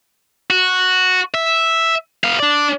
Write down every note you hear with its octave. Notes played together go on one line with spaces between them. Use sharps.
F#4
E5
B3 F5
D4 D5